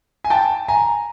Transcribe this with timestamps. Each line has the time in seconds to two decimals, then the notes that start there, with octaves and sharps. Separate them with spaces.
0.24 G#5
0.30 G5 A5
0.68 G#5 A#5